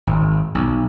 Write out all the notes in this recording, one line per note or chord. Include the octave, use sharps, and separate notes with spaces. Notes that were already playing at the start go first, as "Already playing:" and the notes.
G#1
B1